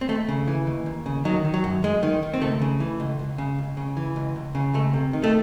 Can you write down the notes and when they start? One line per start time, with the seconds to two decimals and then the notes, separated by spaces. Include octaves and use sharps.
0.01 C4
0.08 D#2 A3
0.29 C#3
0.48 E3
0.67 D#2
0.86 D#2
1.06 C#3
1.25 D#3 F#3
1.45 D#3
1.54 F#3
1.64 F#2
1.83 F#2 G#3
2.03 D#3
2.23 D#3
2.34 C4
2.41 C#2 A3
2.62 C#3
2.80 E3
3.00 C#2
3.19 C#2
3.38 C#3
3.58 C#2
3.77 C#3
3.97 E3
4.16 C#2
4.36 C#2
4.55 C#3
4.74 C#2 A3
4.94 C3
5.13 D#3
5.24 A3